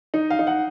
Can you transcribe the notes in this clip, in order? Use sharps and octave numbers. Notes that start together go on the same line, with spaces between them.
D#4
F5
D#4
F#5